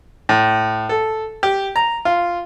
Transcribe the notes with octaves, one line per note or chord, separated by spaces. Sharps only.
A2
A4
G4
A#5
F4